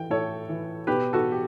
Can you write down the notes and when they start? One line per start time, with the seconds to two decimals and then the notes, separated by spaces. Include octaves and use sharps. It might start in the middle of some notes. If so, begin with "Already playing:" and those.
Already playing: E3 G5
0.10 A2 A4 C#5
0.49 E3
0.87 B2 G4 B4
1.13 F#4 A4
1.32 G4